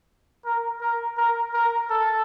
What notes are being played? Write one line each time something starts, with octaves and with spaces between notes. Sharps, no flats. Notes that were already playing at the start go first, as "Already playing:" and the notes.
A#4
A#4
A#4
A#4
A4